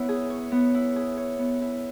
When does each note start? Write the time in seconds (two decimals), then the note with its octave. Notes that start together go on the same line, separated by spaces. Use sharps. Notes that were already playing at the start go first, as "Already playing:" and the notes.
Already playing: B3 E4 C#5
0.09 G#4
0.30 C#5
0.52 B3
0.74 E4
0.96 G#4
1.17 C#5
1.39 B3
1.61 E4